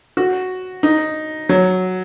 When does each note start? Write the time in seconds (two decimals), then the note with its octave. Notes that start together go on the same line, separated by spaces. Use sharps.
0.17 F#4
0.83 D#4
1.49 F#3